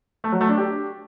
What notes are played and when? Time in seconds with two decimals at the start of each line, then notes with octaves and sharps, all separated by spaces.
0.24 A3
0.32 F#3
0.41 A3
0.49 D4
0.57 G4